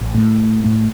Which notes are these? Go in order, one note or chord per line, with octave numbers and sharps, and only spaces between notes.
A1
A2 A3
A2 A3